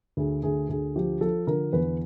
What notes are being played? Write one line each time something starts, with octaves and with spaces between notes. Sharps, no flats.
D2 G#4
D2 G#4
D2 G#4
F3 G4
F3 A4
D3 A#4
E2 B4